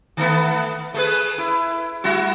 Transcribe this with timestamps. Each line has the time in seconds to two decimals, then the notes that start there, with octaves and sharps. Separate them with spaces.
0.17 D#3 A3 B3
0.94 A3 G#4 B4
1.38 E4
2.04 G3 E4 F#4